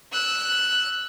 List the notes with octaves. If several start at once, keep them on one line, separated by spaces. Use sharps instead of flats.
E6 F#6